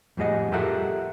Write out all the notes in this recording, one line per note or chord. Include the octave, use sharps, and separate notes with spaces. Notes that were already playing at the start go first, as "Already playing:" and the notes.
F2 A2 G3 G#4 D#5 F#5
F4 G4 A4 A#4 E5 F#5